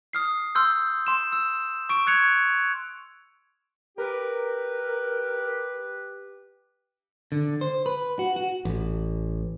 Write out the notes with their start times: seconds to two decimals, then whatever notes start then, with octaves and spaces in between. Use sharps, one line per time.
0.13 D#6 F6 C7
0.55 C6 E6 F6 G6
1.07 C6 E7
1.32 E6
1.89 C#6 D7
2.07 F#6 G#6 C#7 F7
3.98 G4 A#4 B4
7.32 D3
7.61 C5
7.86 B4
8.19 F#4
8.36 F#4
8.65 A1